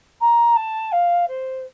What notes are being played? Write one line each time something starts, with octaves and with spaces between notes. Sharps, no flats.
A#5
A5
F5
C5